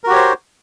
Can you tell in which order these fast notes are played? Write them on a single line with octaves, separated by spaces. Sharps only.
A#4 F#4 G4 C#5 C5